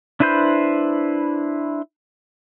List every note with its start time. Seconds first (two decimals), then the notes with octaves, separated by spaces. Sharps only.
0.20 D4 E4 B4 C5 G6